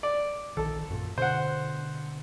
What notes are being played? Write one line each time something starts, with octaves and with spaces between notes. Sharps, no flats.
D5
A#1 D#3 A4
F#2 A#2
B2 D3 C5 F#5